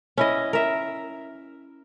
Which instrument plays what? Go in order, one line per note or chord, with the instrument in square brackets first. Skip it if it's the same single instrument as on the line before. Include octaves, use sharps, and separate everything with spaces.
[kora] C#4 E4 D#5
A#4 E5